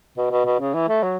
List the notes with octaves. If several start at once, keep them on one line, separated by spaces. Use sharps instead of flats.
B2
B2
B2
C#3
E3
A3
F#3